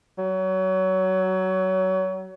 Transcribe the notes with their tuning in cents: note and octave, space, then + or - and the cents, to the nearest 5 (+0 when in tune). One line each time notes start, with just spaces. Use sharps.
F#3 +25